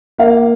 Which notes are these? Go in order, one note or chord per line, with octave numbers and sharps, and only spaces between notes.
A#3 F5